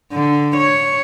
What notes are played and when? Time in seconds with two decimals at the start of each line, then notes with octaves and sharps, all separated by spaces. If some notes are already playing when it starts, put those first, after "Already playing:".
0.12 D3
0.56 C#5